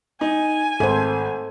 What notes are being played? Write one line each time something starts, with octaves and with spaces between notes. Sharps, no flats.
D#4 G#5
G#1 A4 C5